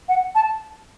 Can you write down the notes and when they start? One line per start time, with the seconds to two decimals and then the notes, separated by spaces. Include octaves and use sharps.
0.09 F#5
0.35 A5